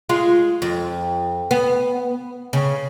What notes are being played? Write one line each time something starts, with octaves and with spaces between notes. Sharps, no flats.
G#3 F4
F2
B3
C#3